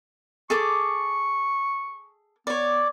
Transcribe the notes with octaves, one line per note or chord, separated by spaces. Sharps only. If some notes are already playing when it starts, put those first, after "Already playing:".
G#4 A4 C#6 D6
B3 C#5 D5